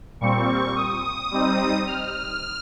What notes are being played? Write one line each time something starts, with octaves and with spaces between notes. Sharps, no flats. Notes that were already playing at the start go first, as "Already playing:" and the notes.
A#2 G3 C4 C#6
D#6
G3 C4 D#4
F6